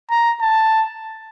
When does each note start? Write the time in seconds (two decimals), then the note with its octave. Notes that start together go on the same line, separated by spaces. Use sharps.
0.10 A#5
0.41 A5